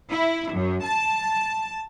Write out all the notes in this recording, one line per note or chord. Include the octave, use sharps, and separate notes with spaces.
E4
F#2
A5